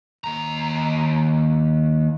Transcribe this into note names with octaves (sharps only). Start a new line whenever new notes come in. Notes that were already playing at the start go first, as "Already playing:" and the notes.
D#2 A#5